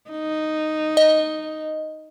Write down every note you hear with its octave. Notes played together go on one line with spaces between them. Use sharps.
D#4
D#5